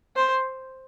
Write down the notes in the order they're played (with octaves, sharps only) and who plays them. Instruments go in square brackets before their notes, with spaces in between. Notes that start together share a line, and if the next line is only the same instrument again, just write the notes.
[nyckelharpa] C5